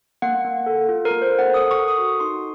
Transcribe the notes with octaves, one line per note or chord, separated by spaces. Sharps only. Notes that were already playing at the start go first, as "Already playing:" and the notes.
A#3 F#5
A#3
A4
F4
A#4
A#3
C5
A4
F#5
A4 D#6
C#6
A4
D#6
F#4
D#4 C6